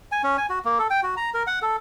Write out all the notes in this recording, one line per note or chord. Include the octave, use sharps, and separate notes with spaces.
G#5
C#4
G#5
F#4
A#3
A4
G5
F#4
A#5
A#4
F#5
A4